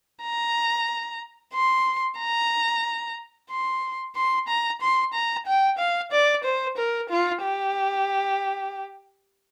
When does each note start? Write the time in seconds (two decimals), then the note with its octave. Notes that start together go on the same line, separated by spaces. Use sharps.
0.23 A#5
1.54 C6
2.19 A#5
3.50 C6
4.16 C6
4.48 A#5
4.81 C6
5.14 A#5
5.47 G5
5.78 F5
6.12 D5
6.44 C5
6.77 A#4
7.09 F4
7.43 G4